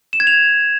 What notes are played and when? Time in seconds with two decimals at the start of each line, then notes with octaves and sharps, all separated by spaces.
0.13 E7
0.20 G#6
0.27 F7